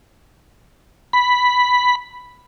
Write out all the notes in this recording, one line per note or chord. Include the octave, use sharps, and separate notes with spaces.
B5